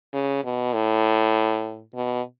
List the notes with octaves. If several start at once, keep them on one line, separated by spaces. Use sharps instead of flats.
C#3
B2
A2
B2